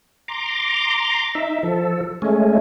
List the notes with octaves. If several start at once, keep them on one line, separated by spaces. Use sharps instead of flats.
A#5 C6 D6
D#4 E5
F3 A4
G#3 A3 C#4